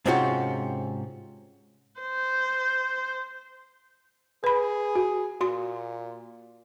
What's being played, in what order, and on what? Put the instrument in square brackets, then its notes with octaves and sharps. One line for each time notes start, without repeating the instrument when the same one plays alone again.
[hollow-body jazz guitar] G#2 C3 C4 C#4 F4 F#4
[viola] C5
[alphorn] G#4 [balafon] B4 B5
[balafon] F#4
[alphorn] A#2 [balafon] F#4 C6